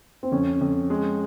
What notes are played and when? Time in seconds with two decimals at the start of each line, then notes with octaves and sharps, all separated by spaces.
0.23 C4
0.32 F2 C#4
0.61 F2
0.90 G#3